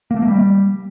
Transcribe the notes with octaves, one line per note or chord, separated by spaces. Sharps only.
A#3
A3
A#3
G3